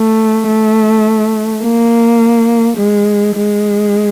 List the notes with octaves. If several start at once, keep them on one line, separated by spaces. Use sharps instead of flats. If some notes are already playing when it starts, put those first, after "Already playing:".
Already playing: A3
A3
A#3
G#3
G#3